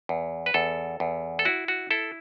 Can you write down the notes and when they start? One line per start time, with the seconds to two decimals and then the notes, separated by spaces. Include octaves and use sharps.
0.09 E2
0.46 B4
0.54 E2 A4
1.00 E2
1.39 A4
1.45 E4 F#4
1.68 F#4
1.91 E4 A4